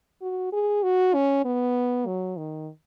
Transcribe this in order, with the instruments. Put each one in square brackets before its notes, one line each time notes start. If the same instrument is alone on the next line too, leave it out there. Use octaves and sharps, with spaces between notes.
[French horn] F#4
G#4
F#4
C#4
B3
F#3
D#3